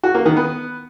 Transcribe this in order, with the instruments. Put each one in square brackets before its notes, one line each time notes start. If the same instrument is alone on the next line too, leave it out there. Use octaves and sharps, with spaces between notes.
[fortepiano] F#4
A#3
D#3
B3